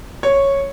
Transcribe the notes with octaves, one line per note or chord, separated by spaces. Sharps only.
C#5